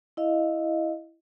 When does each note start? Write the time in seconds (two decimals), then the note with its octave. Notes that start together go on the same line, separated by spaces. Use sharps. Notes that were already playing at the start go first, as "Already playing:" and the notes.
0.17 E4 D#5 F5